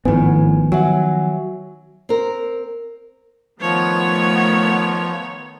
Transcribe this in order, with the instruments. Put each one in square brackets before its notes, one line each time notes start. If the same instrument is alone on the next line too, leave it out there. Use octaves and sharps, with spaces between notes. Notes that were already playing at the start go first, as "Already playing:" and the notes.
[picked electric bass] G#1 A2 [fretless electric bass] D#3 F3 B3 [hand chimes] B4 G#5
[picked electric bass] F#3 [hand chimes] E5 F#5 G#5
[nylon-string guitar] C4 A#4
[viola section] D#3 A3 B3 [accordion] F3 [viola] C#5